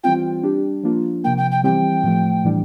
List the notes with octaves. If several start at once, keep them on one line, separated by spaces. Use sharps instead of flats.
E3 G3 C4 F4 G5
G3 D4 G4
F3 A#3 D4 F4
C3 F3 A#3 G5
G5
G5
E3 G3 C4 E4 G4 G5
A2 F3 A3
A2 E3 G3 D4